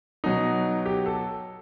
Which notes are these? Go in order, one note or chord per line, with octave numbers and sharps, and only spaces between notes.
B2 F#3 D#4
G4
A4